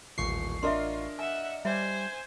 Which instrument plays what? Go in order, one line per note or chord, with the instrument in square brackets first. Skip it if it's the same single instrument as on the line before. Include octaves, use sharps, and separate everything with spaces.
[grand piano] D#1 [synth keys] A1 C#6 C7
[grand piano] D4 A#4 D#5 [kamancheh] F4 [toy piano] E5 C6
[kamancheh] E5 F#5 [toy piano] G#5
[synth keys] G3 [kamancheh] C5 G#5 [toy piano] C#5 E5